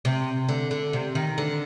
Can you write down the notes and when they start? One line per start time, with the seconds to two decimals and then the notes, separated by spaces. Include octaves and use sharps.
0.05 C3
0.49 D3
0.71 D3
0.93 C3
1.15 D#3
1.38 D3